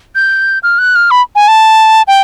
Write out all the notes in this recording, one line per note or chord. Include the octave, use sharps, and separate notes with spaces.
G6
F6
F#6
F6
B5
G#5
A5
G5